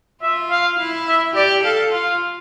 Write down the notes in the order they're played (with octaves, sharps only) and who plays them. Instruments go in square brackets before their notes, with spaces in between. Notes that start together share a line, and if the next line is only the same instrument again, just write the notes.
[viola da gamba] F4 [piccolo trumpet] E5
[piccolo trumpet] F5
[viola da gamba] E4
[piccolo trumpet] E5
[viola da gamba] G4 [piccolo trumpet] D5
[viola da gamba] A4 [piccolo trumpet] F5
[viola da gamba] F4 [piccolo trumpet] F5